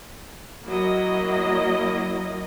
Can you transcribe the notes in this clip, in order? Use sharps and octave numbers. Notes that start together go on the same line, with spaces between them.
F#3 A#3 E4 D#5